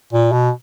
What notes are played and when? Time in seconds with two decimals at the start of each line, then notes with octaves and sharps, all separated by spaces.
0.13 A#2
0.32 B2